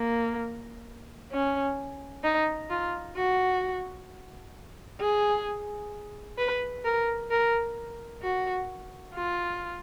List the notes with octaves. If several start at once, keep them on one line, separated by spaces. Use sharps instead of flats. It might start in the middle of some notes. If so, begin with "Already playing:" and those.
Already playing: A#3
C#4
D#4
F4
F#4
G#4
B4
A#4
A#4
F#4
F4